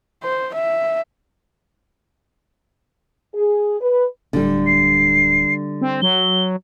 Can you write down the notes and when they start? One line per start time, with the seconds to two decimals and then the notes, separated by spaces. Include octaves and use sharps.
0.23 C5
0.54 E5
3.34 G#4
3.80 B4
4.33 D1 D3 G3
4.67 C7
5.81 C4
6.02 F#3 G7